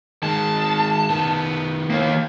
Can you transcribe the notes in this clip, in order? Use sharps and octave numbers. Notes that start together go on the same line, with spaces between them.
D#3 G#3 A5
D#3 B3
D#2 A#3